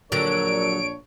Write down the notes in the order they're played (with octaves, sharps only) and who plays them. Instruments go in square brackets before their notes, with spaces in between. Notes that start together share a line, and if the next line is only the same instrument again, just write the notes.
[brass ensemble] A#1 D4 C#5 [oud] D3 F#3 [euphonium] A#4 [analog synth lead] D7